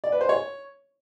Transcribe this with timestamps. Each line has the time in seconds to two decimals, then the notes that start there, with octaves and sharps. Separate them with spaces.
0.04 D5
0.12 B4
0.21 C5
0.29 C#5